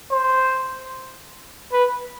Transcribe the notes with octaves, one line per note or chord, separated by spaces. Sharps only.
C5
B4